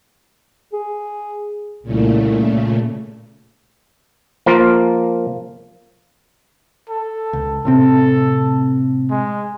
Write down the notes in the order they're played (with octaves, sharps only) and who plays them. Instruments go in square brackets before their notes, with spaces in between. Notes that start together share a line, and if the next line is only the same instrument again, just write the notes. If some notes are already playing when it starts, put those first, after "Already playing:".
[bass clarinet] G#4
[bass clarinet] C2 [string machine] A#2 C#3 A3
[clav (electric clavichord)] F3 A#3 F4 A#4
[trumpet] A4
[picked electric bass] C#2
[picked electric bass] A2 C3 C4 [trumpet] A4
[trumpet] G#3